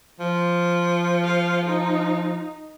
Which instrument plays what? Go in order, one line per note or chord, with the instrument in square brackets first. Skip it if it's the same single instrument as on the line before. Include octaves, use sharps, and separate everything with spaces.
[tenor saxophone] F3
[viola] F5
D#4